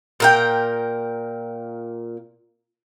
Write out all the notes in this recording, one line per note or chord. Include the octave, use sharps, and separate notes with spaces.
A#2 A#4 G5